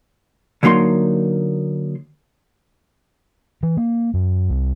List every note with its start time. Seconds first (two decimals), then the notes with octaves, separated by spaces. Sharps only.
0.63 D3 F#3 A#3 D#4 C6
3.63 E3
3.77 A#3
4.14 F#2
4.50 C2